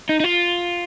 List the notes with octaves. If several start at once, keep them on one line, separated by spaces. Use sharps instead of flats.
D#4
D#4
F4